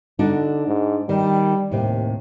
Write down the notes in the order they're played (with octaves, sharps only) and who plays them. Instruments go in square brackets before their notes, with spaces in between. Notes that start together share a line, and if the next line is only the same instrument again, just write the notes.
[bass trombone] D3 [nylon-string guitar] D4 D#4 F#4
[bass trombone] G#2
[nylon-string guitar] D#3 [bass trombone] G3
[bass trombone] D#2 [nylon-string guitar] A2 C3